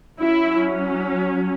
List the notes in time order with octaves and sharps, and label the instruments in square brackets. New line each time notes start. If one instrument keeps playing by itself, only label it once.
[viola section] F#3 C#4 E4